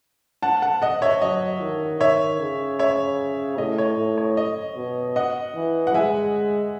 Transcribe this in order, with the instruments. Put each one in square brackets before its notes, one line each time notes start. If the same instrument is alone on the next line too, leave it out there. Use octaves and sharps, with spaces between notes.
[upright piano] F#5 A5
F#5 A5
D#5 F#5
C#5 E5
[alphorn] F#3 [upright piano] D#5
[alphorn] D#3
[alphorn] D#3 [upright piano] C#5 E5
[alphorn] C#3
[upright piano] C#5 E5
[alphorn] A2 [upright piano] D#5
[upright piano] C#5
[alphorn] A2
[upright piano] C#5
D#5
[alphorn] B2
[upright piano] D#5 F#5
[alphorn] E3
[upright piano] F#5
[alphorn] G#3 [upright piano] E5 G#5